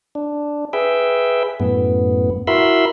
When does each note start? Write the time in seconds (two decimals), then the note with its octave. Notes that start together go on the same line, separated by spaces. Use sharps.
0.15 D4
0.73 G#4 B4 E5 G5
1.60 F#2 A2 B3
2.47 E4 F#4 A#4 E5 B5 C6